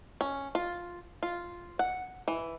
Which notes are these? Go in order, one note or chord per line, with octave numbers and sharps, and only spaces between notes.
C#4
F4
F4
F#5
E3